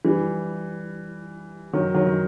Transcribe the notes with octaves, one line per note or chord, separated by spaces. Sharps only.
E3 G3
D#3 F#3
D#3 F#3
D#3